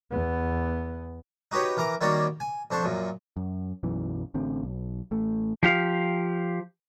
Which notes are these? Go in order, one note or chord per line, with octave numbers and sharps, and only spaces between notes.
E2 B3
D#4 F#4 G4 B4 C#5
E3 A#4 A#5 D6
D#3 G3 A#3 F#4 C#5 D5
G#5
F2 D4 C5 C#6
F#2 A#2
F#2
B1 F#2 E3
A1 D3 C4
B1
A1 A3
F3 G4 F5